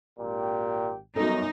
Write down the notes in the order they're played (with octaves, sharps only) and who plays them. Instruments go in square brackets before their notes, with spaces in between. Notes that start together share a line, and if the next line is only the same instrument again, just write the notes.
[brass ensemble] G#1 G4 G5 [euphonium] A#2
[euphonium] F#2 [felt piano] F#3 B3 A4 [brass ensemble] G3 C#4 [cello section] D#4